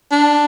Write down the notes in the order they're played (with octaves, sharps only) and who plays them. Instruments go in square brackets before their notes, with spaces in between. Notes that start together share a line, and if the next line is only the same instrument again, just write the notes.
[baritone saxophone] D4